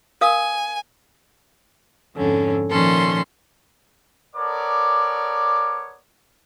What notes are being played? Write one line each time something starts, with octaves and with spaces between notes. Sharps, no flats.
A#4 F5 G#5 D#6
F2 G#2 D3 C#4
A#2 D#3 F3 C#4 A4 C6
B3 A4 A#4 C#5 D5 D6